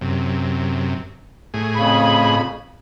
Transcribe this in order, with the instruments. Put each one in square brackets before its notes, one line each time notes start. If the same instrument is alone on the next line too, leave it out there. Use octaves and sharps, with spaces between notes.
[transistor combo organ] F#2 C3
A2 G#4
[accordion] F2 C#3 B5